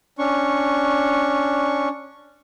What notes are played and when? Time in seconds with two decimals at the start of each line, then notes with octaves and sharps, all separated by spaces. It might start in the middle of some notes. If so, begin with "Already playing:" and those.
0.19 C#4 D4 C#6